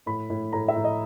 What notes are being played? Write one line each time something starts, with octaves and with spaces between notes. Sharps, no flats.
A2 B5
A2
A2 A#5
E5
A2
D#5